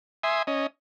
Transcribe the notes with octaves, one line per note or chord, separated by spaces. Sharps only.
E5 G#5 C6 D#6
C#4 D#5